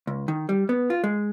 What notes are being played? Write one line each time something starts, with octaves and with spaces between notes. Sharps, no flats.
C#2
D#3
G3
B3
F4
G#3